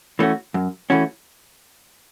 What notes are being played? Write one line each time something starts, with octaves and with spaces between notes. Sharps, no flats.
E3 A3 C#4 F#4
F#2
E3 A3 C#4 F#4